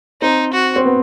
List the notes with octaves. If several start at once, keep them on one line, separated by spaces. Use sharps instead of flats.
C4 D#4
F#4
C4
B3